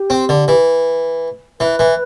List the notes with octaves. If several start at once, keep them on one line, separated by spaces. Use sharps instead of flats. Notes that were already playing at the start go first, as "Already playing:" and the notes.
Already playing: G4
C4
D3
E3
E3 B4
E3